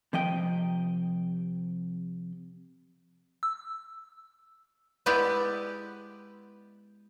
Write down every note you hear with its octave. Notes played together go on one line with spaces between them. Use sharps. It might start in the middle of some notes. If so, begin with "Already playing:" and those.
C3 F3 D#5 G5
E6
G#3 B3 E4 G4 B4 D5